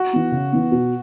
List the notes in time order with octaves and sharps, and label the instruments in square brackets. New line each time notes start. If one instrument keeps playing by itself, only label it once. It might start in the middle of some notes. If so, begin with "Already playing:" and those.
Already playing: [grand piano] F#4
[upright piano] E3 B3
C#3
E3 B3
B2